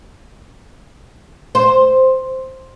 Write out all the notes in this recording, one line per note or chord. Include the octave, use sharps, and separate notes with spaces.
C5